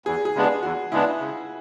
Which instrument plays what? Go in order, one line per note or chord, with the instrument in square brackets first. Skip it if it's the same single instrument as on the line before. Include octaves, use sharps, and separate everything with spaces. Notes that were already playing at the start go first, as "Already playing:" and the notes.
[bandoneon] E2 [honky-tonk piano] G#4
[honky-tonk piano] G#4
[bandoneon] C#3 G#3 B3 D4
[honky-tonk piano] G#4
[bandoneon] E2 [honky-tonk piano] F#4
[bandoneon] C#3 G#3 B3 D4 [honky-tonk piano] E4
[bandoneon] C#3